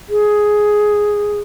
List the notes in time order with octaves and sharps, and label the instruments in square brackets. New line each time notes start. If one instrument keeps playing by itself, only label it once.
[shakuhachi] G#4